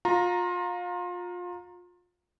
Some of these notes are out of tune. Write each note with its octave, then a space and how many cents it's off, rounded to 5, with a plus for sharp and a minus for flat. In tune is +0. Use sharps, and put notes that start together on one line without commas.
F4 +25 A#5 +0